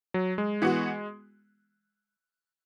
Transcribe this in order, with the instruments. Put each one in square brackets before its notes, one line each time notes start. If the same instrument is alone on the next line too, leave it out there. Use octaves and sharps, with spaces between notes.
[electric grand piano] F#3
G#3
[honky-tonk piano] E3 B3 F#4